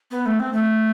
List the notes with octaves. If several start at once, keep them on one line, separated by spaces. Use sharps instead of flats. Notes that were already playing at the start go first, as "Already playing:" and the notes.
B3
A3
C4
A3